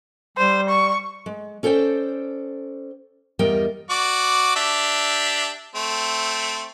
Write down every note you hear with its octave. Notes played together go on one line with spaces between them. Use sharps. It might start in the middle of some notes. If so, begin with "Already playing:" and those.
G3 C5
C#6
G#3
C#4 A4 C5 D5 G5
E2 G3 B3 A#4 D#5 G5
F#4 D5 D6
D4 G4 E5
A3 C4